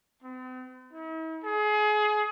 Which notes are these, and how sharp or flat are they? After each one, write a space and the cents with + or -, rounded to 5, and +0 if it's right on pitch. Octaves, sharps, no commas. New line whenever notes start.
C4 -45
E4 -45
G#4 +30